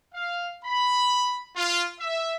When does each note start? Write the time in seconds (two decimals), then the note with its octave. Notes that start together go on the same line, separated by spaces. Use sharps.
0.13 F5
0.65 B5
1.56 F4
2.00 E5